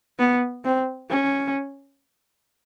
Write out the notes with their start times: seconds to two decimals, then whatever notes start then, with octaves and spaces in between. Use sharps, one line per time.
0.19 B3
0.65 C4
1.10 C#4